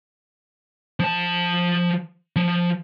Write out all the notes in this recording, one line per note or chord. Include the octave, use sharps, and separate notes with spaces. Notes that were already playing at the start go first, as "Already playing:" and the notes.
F3 A5
F3